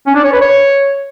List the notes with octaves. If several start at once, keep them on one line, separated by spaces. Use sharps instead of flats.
C#4
D4
C#5
B4
C#5